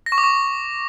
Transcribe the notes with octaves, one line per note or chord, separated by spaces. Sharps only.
A#6
C#6
D6
C#6